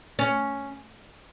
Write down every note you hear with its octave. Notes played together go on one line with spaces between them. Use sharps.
C#4